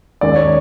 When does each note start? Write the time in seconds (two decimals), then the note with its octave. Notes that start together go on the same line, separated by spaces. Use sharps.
0.21 D#2 D#3 G#3 C#4 D5
0.36 C#5